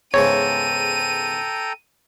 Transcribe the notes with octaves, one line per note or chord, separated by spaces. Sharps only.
E2 G#2 C#3 A4 C#5 G5 A#5 D#7